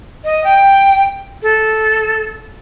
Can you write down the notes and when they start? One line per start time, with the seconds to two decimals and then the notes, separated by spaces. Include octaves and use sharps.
0.24 D#5
0.44 G5
1.43 A4